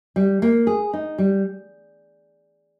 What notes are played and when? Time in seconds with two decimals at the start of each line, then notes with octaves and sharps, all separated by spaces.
0.16 G3
0.42 A#3
0.67 G#4
0.93 D#4
1.18 G3